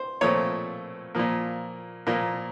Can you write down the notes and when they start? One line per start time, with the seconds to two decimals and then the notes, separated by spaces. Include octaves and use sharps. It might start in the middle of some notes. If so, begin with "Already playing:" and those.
Already playing: C5
0.21 A#2 F3 A3 C4 C#5
1.15 A#2 F3 A#3
2.07 A#2 F3 A#3